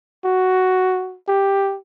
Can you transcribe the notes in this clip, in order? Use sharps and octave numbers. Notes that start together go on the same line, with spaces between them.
F#4
G4